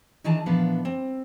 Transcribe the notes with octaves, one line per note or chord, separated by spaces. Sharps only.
D#3 E3 D4 G#4 A5 A#5
E2 A#2 F3 B3 D4 F5
C4